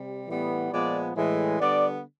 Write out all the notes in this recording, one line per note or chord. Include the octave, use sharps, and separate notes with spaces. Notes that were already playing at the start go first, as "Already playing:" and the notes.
Already playing: C3 G3
A2 E3 G3 B3
A#2 F3 G#3 B3 D5
A2 E3 G#3
D3 G3 B3 D5